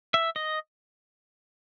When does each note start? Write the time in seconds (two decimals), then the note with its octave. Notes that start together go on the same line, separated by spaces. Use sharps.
0.14 E5
0.36 D#5